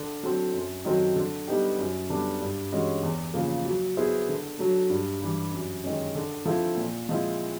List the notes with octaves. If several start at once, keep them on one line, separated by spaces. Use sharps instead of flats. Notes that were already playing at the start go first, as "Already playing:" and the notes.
Already playing: D3
F#3 A3 C4
F#2
D#3 F#3 A3 C4
D3
G3 B3 D#4 G4
F#2
D3 G3 B3 D4
G2
E3 G#3 C#4 F#4
E2
C#3 F3 A#3
F#3
B3 E4 G#4 C5
D3
F#3 A3
G2
E3 G3
F#2
D#3 G#3 C#4
D3
F3 A3 C4 E4
A#2
F3 G#3 C4 E4